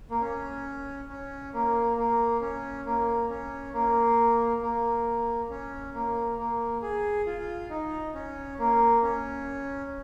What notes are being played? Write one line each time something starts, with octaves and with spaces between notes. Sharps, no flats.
A#3
C#4
C#4
A#3
A#3
C#4
A#3
C#4
A#3
A#3
C#4
A#3
A#3
G#4
F4
D#4
C#4
A#3
C#4